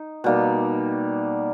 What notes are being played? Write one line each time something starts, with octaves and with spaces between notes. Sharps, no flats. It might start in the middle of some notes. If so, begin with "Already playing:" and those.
Already playing: D#4
B2 G3 A#3 D#4